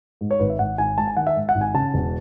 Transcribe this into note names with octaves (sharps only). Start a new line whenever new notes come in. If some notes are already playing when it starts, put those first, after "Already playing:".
G#2
C#5
G#1 B4
E5
G#1 F#5
G#1 G#5
G#2 A5
G#5
D#3 F#5
E5
G#2
F#5
G#1
G#5
C#3 A5
E1